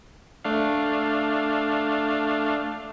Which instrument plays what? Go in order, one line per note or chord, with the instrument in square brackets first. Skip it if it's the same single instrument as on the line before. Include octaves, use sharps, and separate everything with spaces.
[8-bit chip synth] A3 D4 F5